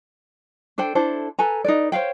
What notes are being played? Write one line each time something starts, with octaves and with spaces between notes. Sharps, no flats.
D4 A4 C5 G5
D4 E4 A4 C5
A4 B4 G#5 A#5
D#4 B4 D5
C5 C#5 F5 G5